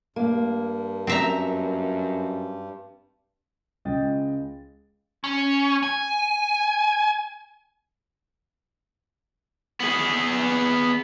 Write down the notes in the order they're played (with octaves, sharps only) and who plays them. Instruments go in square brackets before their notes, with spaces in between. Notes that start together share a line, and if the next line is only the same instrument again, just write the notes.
[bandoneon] G2 [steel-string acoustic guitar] A#3
[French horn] F#2 [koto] C4 E5 A#5
[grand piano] C#2 G#3 C#4 D#5 G5 A6
[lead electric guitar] C#4
G#5
[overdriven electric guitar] B3 G#4